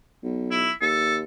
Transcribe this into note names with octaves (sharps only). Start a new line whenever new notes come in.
B1
E4
D#2 A4